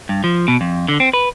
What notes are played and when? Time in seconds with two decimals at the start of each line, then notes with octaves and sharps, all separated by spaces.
0.09 G2
0.24 F3
0.48 B2
0.61 F2
0.88 D3
1.00 C4
1.14 B4